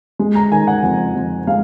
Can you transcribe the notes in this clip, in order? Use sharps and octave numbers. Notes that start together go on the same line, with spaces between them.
G#3
A#5
D#3 G#5
F#5
F2
F2
G#3 F5